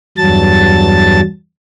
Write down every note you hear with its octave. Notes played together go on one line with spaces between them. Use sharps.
E2 G2 F#3 A5 A6